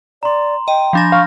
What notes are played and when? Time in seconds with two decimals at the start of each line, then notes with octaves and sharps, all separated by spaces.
0.23 D5 A#5 C6
0.68 D#5 G5
0.93 F3 D4 G#5 B5 G6 A#6
1.12 F5 C#6 F6